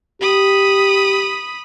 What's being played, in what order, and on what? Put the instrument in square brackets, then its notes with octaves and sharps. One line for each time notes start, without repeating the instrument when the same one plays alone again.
[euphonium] G4 [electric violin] B5 D#6